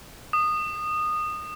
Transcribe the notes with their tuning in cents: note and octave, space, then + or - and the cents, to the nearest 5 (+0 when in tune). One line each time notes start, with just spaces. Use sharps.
D#6 -20